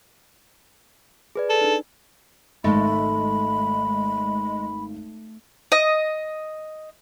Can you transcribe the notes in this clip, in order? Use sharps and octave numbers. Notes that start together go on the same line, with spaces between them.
G#4 B4 D5
A4
D4 D#4
G#1 G#3 A3 B5
D#5